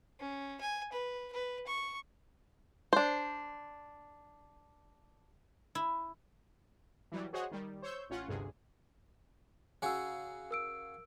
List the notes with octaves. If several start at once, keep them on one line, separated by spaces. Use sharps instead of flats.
C#4
G#5
B4
B4
C#6
D4 C5
E4
E3 F#3 G3
F#4 G#4 C5 C#5 D#5 F#5
D#3 G3
C5 C#5 C#6 E6 G6
A1 C#4 F4 F#5
G1 D2 G2 C3 G#4
C#3 F#4 G#4 G#5 E6
A#4 E6 D7